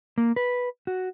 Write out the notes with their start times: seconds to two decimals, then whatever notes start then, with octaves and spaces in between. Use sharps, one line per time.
0.18 A#3
0.36 B4
0.87 F#4